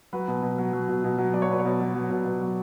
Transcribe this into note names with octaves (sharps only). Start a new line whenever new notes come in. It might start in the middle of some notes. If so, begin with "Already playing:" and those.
F#3 B4
B2
B2
F#3
F#3
B2
B2
F#3
F#3 D5
C#5
B2 B4
C#5
B2
F#3
F#3
B2
B2
F#3